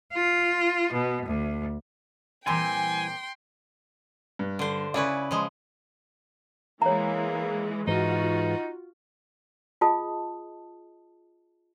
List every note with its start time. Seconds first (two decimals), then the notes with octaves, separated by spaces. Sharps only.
0.13 F4
0.93 B2
1.26 D2
2.47 A#2 E3 G3 C4 G5 G#5 C6
4.39 G2
4.59 D3 C5
4.94 C#3 E4 B4 D5 G#5 C#6
5.31 F3 G#3
6.82 E3 G#3 A#3 C#5 A#5
7.87 G#2 E3 D#4 F4 F#4
9.81 F4 G#4 D#5 A5 D#6